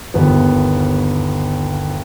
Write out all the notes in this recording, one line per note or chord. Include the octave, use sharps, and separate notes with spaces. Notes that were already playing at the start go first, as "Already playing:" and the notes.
G1 D#2 B3